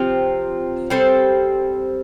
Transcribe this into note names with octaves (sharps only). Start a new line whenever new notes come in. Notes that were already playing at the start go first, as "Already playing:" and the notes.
Already playing: C3 F3 C4 F4
G3 C4 A4 C5